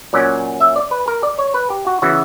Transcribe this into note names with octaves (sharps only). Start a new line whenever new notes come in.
A#2 F#3 C#4 D5
E5
D5
B4
A#4
D5
C#5
B4
G4
F#4
C#3 E3 B3 F#4